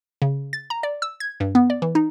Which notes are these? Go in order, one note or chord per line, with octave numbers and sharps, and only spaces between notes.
C#3
A6
A#5
D5
E6
G#6
G2
B3
D5
E3
D#4